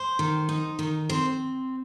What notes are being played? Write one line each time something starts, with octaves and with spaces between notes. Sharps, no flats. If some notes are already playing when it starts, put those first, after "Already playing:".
Already playing: C5
D#3
D#4
D#3
C4 C5